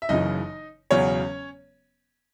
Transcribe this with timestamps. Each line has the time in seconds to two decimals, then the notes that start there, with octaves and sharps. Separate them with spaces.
0.02 E5
0.09 F#1 F#2 C#3 E3 D#4 D#5
0.91 E1 E2 C#3 F#3 C#4 C#5